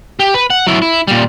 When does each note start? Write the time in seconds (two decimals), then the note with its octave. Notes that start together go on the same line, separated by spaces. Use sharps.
0.19 G4
0.34 B4
0.50 F#5
0.67 F#3 E4
0.82 E4
1.08 A#2 G3